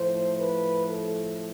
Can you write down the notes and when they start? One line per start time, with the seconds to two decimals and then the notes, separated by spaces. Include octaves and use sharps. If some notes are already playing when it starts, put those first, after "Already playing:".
Already playing: A2 F3 C5
0.38 B4
0.89 A4